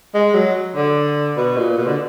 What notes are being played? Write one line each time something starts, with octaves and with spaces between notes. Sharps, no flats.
G#3
F#3
D3
B2
A#2
B2
D3